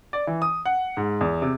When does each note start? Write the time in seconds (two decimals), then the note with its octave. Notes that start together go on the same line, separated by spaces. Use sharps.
0.13 D5
0.27 E3
0.42 D#6
0.65 F#5
0.97 G#2
1.21 E2
1.42 C3